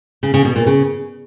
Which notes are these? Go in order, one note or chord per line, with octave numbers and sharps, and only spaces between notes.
C#3
C#3
B2
A#2
C#3